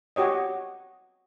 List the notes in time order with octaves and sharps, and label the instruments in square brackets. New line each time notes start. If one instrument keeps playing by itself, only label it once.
[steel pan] F#4 G4 C#5 D#5